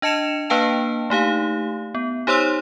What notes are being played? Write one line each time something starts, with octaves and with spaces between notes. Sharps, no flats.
D4 D#5 A5 C#7 E7 F7
A#3 D4 B4 F5 G5 A5
A3 D#4 G4 F5
B3
D#4 G4 C5 C#5 C6 E6